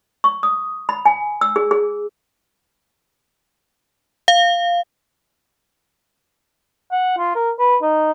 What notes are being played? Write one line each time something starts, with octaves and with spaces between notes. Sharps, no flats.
C#6
D#6
B5
G#5
E6
G#4
G#4
F5
F#5
F4
A#4
B4
D#4